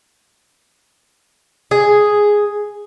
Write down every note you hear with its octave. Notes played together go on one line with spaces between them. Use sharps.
G#4